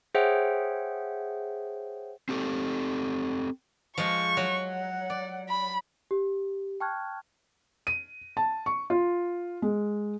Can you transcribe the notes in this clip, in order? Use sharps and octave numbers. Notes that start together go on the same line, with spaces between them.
G#4 C5 C#5 E5 F#5 G5
C4 G4 A4
F3 G#3 C#6
F#3
F#5
D5
B5
G4
G5 A5 C#6 F6 F#6 G#6
D#7
A5
C#6
F4
G#3